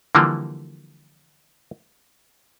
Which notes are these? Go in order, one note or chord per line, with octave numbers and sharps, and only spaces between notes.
D3 E3 F3 G3 A#3